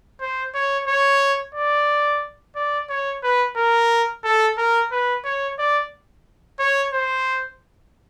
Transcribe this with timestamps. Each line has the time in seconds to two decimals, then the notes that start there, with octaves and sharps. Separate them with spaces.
0.21 C5
0.54 C#5
0.88 C#5
1.54 D5
2.56 D5
2.89 C#5
3.23 B4
3.56 A#4
4.24 A4
4.58 A#4
4.92 B4
5.25 C#5
5.58 D5
6.59 C#5
6.93 C5